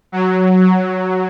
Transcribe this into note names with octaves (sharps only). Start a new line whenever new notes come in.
F#3
F#3